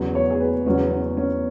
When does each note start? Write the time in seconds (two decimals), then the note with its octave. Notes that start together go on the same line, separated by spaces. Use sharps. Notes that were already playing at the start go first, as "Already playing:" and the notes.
Already playing: E2 C#3 F#3
0.15 C#5
0.30 G#4
0.40 B4
0.66 E2 C#3 F#3 C#4
0.91 C#4
1.17 C#4